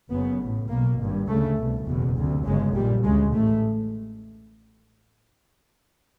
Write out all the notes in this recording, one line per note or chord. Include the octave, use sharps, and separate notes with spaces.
F#1 F#2 C#3 B3
A1 A2
B1 B2 A#3
G#1 G2
D2 C#3 A3
C2 B2
F#1 E2 B2
D2 C3
G1 F#2 C#3 G#3
A#1 A#2 G3
D2 C#3 G#3
A1 A2 A3